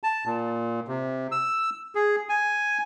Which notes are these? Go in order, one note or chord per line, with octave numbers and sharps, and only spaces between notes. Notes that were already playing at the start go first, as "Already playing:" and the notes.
A5
A#2
C3
E6
G#4
G#5